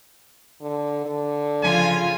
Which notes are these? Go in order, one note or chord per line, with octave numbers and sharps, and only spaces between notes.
D3
D3
C#3 F3 F4 G#5